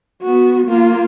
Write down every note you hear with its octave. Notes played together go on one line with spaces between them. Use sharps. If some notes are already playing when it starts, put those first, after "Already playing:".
B3 F#4
A#3 F4